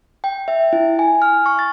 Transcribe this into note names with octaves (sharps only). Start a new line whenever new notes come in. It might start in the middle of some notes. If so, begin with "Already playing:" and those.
G5
E5
E4
G#5
F6
C#6
A6